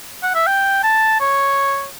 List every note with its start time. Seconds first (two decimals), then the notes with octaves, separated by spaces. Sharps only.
0.23 F#5
0.35 E5
0.47 G5
0.83 A5
1.20 C#5